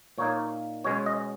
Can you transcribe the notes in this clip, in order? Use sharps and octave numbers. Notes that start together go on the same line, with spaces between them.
A#2 A#3 D#4 C#5
B2 G#3 C#4 C#5
D#5